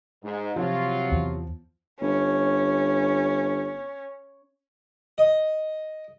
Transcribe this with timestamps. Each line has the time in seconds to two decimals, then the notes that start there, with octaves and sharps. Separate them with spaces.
0.24 G#2
0.56 C3 F3 F#3 F4
1.11 E2
2.01 G1 C#4
5.18 D#5